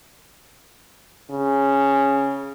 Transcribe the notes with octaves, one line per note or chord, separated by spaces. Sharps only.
C#3